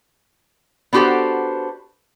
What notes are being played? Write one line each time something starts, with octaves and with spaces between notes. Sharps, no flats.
B3 D4 F#4 G4 A4 C5